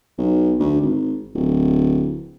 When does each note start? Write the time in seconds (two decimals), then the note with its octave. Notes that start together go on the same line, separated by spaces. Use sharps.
0.18 B1
0.59 D2
0.81 G#1
1.35 D1